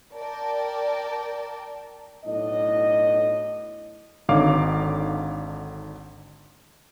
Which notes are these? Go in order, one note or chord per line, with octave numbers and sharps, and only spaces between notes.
A#4 D5 G5 A5
B1 A2 D4 D#5
G#1 D3 D#4 C#5 F5 D6